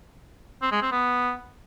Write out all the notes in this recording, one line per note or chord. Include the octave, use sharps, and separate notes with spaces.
C4
G#3
C4
B3